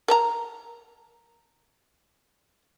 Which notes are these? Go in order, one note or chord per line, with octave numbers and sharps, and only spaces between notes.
A#4 A5 A#5